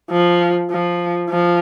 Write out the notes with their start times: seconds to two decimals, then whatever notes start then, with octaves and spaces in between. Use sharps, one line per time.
0.11 F3
0.70 F3
1.30 F3